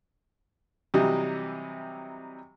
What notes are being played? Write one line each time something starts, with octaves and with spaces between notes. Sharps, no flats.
C3 E3 F#3 G3 D#4 G4